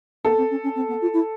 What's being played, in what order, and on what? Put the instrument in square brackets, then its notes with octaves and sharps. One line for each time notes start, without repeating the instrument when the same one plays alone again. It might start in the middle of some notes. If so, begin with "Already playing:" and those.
[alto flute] B3 [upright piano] A4
[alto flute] C4
C#4
C#4
C4
B3
F4
E4